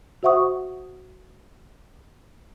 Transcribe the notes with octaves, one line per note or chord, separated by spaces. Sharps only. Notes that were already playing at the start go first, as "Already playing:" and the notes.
F#4 C5 E5 F#5 C#6 D#6